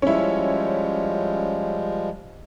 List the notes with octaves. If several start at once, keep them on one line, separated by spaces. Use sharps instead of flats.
F3 G3 G#3 C#4 E4